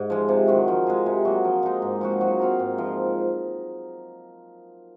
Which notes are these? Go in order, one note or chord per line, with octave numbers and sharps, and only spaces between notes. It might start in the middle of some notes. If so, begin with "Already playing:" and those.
Already playing: G#2
F3 G#3
C3
D#3 F#3
F3
G#3 D#4 G#4
C3
F#3 A#3
F3
G#3 D#4
G#2
F3 C4 F#4
F#3
C4 F4 A#4
G#2
F3 C4 F4